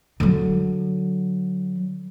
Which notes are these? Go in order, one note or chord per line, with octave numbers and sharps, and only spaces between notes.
D3 F#3